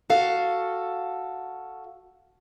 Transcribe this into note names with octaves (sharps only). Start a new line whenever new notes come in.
F#4 A4 F5